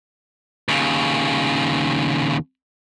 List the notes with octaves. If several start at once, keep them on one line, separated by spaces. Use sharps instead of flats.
D#2 C#3